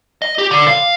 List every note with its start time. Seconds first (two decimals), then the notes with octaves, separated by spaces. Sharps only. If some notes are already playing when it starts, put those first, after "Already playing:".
0.22 D#5
0.38 G4
0.51 D3
0.68 F5